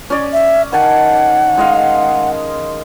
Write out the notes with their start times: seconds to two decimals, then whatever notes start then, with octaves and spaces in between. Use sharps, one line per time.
0.10 C#4 D5
0.33 E5
0.73 D#3 F#5 G#5 A5
1.57 G#3 D#5 F5